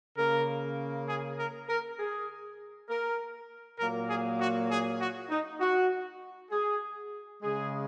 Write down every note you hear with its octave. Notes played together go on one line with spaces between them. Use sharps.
C#3 A#3 A#4
G#4
A#4
A#4
G#4
A#4
A#2 F#3 A#3 A#4
G#4
F#4
G#4
F#4
D#4
F#4
G#4
C#3 G#3 G#4